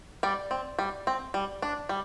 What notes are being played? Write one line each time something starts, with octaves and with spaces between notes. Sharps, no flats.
G3 D5
C4
G3
C4
G3
D4
G3